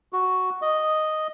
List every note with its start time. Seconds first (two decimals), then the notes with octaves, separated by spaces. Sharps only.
0.13 F#4
0.62 D#5